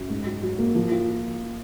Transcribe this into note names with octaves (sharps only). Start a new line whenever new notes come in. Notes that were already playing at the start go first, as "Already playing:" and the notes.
Already playing: F#2
G#2
F#3
F#3
A#3
F3
F4